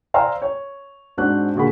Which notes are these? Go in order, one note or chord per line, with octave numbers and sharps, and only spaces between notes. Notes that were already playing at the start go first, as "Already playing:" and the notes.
C5 D5 F5 A#5 C6 E6
C#5
G#2 C4 D4 F#4 F#6
A#2 D3 F#4 G#4 A#4 B5